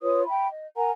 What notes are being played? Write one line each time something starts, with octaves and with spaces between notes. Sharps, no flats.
F4 B4 C#5 D#6
E5 G5 B5
D#5
A#4 F#5 G#5 A#5